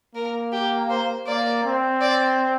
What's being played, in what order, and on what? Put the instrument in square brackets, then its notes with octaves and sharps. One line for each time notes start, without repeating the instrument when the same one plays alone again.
[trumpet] A#3 [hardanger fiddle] A#4
[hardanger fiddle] G4
C5
[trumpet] A#3 [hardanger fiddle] D5
[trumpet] C4
[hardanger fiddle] D5